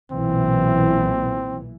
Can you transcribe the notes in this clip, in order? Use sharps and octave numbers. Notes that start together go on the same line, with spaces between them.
B1 A#2 E3 C4